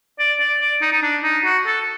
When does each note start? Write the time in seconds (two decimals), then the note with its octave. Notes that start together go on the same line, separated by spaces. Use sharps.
0.19 D5
0.40 D5
0.61 D5
0.82 D#4
0.93 D#4
1.03 D4
1.24 D#4
1.45 F#4
1.66 A4